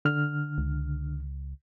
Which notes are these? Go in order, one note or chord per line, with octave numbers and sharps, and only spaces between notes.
D3 F6
C#2